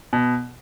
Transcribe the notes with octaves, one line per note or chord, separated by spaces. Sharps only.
B2